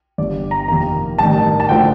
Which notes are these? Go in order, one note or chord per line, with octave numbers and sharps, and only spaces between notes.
G1 G2 D3 G3 D5
A#5
F2 C3 D#3 A#3 A#5
A1 G2 D#3 A5
A5
D3 F3 A3 G5